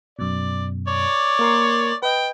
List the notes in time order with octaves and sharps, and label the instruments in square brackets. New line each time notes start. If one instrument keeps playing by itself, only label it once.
[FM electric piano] F#2 B2 [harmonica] D5
[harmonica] C#5 D5 D6
[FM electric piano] A#3 A#4 C6
[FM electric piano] B4 D#5 [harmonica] G5